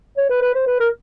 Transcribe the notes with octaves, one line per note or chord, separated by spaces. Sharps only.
C#5
B4
B4
C5
B4
A#4